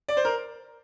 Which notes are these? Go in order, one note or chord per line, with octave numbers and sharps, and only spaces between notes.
D5
C5
A#4